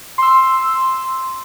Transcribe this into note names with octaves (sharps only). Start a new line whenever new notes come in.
C6 E6